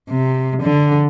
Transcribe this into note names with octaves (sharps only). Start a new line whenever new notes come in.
C3
D3